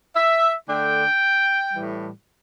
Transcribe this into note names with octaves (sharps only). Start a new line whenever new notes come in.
E5
D3 A3 D4 G5
A2 E3 G3